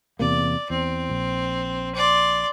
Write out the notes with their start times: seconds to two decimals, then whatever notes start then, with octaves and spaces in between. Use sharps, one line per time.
0.19 E2 C3 A#3 D5
0.70 E2 C4
1.10 A#1
1.95 D5 C6